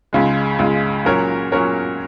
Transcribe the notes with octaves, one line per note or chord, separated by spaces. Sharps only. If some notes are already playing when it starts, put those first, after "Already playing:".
C#2 C#3 G#3
C#2 C#3 G#3
A#2 F#3 C#4 A#4 C#5
A#2 F#3 C#4 A#4 C#5